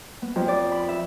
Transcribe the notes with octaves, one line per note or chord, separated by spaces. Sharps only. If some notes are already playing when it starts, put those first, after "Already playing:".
B3
F2
D5
B5
E5